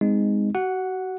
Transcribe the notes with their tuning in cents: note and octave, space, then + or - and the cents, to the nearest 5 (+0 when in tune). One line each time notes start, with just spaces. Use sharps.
G#3 -15 C4 -35 D#4 +0
F#4 +30 F#5 +0